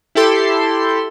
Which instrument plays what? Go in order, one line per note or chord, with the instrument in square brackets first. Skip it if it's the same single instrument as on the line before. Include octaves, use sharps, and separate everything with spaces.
[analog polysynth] E4 G4 A4 C6